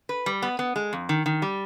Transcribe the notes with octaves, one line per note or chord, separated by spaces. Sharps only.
B4
G3
B3
B3
G#3
F2
D#3
D#3
G3